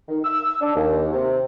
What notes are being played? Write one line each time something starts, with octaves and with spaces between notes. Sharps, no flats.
D#3
E6
D4
D#2
C3